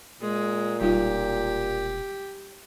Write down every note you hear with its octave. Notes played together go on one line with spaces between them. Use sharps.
A#2 G#3
E1 G3 D#4 F4 G4